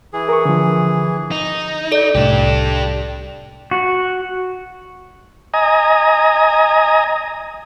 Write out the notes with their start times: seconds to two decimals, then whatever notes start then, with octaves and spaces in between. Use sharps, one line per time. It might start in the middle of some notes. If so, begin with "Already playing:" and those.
0.13 E3 G#4
0.29 A#4 C#6
0.45 D3 F3
1.31 D#4
1.92 A4 D5
2.15 C2 A2 D4 G4
3.71 F#4
5.54 D#5 G#5 A#5 D#6